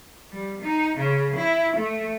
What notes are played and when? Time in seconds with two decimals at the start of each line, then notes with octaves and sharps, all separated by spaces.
0.32 G3
0.62 D#4
0.98 C#3
1.36 E4
1.76 A3